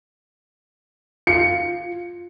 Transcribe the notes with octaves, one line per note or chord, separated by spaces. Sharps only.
F4 C#7